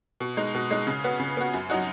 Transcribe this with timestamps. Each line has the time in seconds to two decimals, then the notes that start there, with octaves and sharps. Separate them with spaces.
0.20 B2
0.37 G#3 D#4
0.55 B2
0.71 G#3 D#4
0.87 C#3
1.04 B3 F#4
1.20 C#3
1.37 B3 F#4
1.54 F#2
1.70 F#3 D#4 F#4